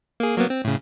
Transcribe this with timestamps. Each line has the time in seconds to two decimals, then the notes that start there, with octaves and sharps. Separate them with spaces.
0.20 A#3 G#4
0.37 F#3 A#3 B3
0.50 C4
0.65 A2 C#3